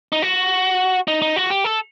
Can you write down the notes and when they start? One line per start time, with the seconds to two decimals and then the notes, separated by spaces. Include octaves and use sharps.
0.12 D#4
0.22 F#4
1.08 D#4
1.22 D#4
1.36 F#4
1.50 G4
1.64 A4